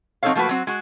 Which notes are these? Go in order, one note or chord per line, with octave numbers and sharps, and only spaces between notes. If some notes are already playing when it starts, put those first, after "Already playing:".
F#3 C4 D#4 A4 C#5 F5
F3 A3 A#3 F#4 B4
F#3 C4 F#4
G#3 F#4